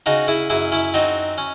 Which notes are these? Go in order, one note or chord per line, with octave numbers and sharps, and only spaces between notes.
C#3 D#4 F#4
E4 G#4
F#2 E4 G#4
C#4 E4
F#3 C4 D#4
C#4